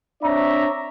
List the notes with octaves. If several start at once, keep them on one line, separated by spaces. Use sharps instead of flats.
C4 D4 C#5 D5 E5 A#5